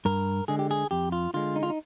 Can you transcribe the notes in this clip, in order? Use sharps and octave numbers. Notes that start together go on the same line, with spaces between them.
G2 A#4
D3 G#3 G#4
G4
G#4
F2 G4
F4
D3 G#3 F4
D#4
F4
D#4